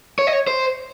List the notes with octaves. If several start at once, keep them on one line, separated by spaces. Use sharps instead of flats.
C#5
D#5
C#5
C5